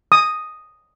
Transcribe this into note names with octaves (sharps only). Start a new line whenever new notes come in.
D#6